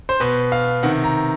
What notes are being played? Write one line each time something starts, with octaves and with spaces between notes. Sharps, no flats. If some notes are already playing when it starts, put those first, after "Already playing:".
C5
B2 B4
F5
C3 D#3 F#5
A#5